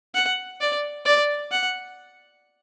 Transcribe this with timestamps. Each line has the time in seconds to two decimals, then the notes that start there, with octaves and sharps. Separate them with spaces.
0.14 F#5
0.61 D5
1.05 D5
1.51 F#5